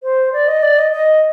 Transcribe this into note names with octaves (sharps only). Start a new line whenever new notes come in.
C5
D5
D#5
D5
D#5
D#5